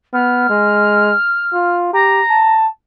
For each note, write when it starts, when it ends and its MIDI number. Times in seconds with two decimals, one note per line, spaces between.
0.13 0.47 59
0.13 1.77 89
0.49 1.14 56
1.53 1.93 65
1.93 2.21 67
1.93 2.57 82
2.29 2.67 81